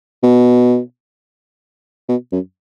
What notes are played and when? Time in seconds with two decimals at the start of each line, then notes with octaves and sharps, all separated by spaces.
0.23 B2
2.09 B2
2.32 F#2